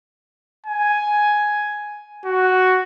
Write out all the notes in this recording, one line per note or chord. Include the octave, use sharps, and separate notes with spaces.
G#5
F#4